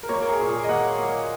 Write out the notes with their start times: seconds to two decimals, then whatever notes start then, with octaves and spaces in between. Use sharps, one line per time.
0.03 A#4
0.09 A#3 C#5
0.22 A#4
0.29 G#4
0.40 A#2
0.49 G#4
0.64 D#5
0.69 A#3 F#5
0.98 A#3